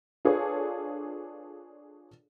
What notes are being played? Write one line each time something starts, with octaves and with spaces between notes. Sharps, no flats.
D4 F4 G#4 A4 B4 C#5